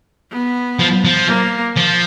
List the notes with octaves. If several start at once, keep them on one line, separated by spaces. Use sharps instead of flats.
B3
F3
F3
A#3
F3